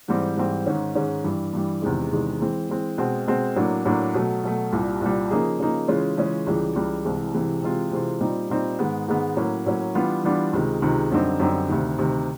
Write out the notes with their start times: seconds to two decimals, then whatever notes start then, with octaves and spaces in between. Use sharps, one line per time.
0.08 G#2 E3 G3 C4
0.37 G#2 E3 G3 C4
0.66 G#2 D#3 G#3 C#4
0.95 G#2 D#3 G#3 C#4
1.24 G2 E3 G3
1.53 G2 E3 G3
1.82 E2 C3 D#3 G#3
2.11 E2 C3 D#3 G#3
2.40 E3 G#3 C4
2.70 E3 G#3 C4
2.98 B2 G#3 C4
3.27 B2 G#3 C4
3.56 A2 F#3 A#3 D4
3.85 A2 F#3 A#3 D4
4.14 B2 F#3 A3
4.43 B2 F#3 A3
4.72 C2 A#2 G3
5.01 C2 A#2 G3
5.30 C#3 F3 A#3 D#4 G#4
5.59 C#3 F3 A#3 D#4 G#4
5.88 C#3 E3 G#3 C#4 F4
6.17 C#3 E3 G#3 C#4 F4
6.47 C#2 C#3 E3 G3
6.76 C#2 C#3 E3 G3
7.05 C2 C3 E3 G#3
7.34 C2 C3 E3 G#3
7.63 C3 E3 G#3 C4 F4
7.92 C3 E3 G#3 C4 F4
8.20 A#2 G3 C4 D#4
8.50 A#2 G3 C4 D#4
8.79 G#2 D#3 G#3 B3
9.08 G#2 D#3 G#3 B3
9.37 A2 F#3 A#3 C#4
9.66 A2 F#3 A#3 C#4
9.95 E3 G3 B3 D4 F4
10.24 E3 G3 B3 D4 F4
10.53 C#2 C3 D#3 G#3
10.82 C#2 C3 D#3 G#3
11.11 F#2 D3 G3 C4 D#4
11.40 F#2 D3 G3 C4 D#4
11.69 D2 C3 D#3
11.98 D2 C3 D#3